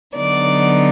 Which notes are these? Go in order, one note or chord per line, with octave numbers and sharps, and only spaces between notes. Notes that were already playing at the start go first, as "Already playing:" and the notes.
D3 F#3 B3 D#4 D5